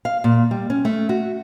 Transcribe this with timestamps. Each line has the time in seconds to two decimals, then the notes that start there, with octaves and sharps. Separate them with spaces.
0.05 F5
0.24 A#2
0.51 G3
0.70 C#4
0.85 A3
1.09 F#4